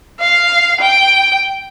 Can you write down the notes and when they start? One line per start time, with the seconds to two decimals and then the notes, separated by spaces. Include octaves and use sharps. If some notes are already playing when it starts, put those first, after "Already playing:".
0.20 F5
0.81 G5